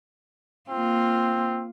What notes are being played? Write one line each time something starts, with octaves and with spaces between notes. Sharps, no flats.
A#3 C4 F4